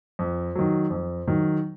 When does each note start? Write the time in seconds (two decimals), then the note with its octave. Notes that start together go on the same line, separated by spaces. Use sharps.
0.19 F2
0.55 D#3 F#3
0.90 F2
1.27 D#3 F#3